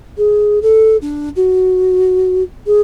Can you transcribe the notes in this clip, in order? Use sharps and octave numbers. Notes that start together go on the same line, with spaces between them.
G#4
A4
D4
F#4
G#4